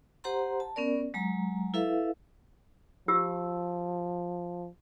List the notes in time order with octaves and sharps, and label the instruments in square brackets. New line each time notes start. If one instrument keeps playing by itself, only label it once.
[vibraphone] G4 C5 F#5 A#5 C6
A5
B3 C#4 A#4 D5
F#3 G#3 A#5
E4 A4 B4 E5 F5
[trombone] F3 [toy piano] F4 G4 E6